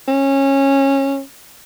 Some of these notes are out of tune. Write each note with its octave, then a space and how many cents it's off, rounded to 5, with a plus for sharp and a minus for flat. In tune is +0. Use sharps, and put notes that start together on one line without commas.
C#4 -20